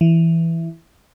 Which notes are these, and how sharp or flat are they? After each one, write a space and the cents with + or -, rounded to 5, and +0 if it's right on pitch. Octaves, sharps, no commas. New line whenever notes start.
E3 +5